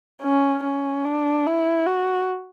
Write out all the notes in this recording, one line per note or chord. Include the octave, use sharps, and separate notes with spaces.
C#4
C#4
D4
E4
F#4